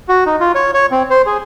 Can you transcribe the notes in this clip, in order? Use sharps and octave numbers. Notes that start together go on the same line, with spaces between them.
F#4
D#4
F4
C#5
C#5
C4
C5
G#4